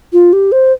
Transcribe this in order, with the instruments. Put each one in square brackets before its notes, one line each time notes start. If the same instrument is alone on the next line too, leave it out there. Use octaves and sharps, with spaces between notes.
[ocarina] F4
G4
C5